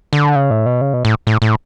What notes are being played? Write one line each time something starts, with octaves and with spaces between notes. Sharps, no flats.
D3
C#3
A2
B2
C#3
B2
A2
A2
A2